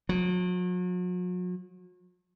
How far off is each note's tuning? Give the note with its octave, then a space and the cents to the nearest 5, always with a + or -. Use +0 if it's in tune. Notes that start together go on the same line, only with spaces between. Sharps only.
F#3 -45